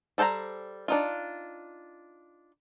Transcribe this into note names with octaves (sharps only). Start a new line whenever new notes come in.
G3 A4 C5 G5 A#5
D4 D#4 F4